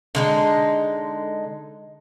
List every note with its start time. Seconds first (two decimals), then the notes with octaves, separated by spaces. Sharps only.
0.15 D3 G#3 D#4